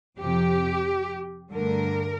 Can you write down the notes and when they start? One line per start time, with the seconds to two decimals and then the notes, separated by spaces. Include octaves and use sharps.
0.18 F2 C3 F3 G4
1.51 G2 D3 A3 A#4